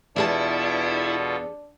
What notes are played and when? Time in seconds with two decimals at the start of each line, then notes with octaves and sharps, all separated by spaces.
0.16 E2 B2 D4 E4 F4 G#4 A4 A5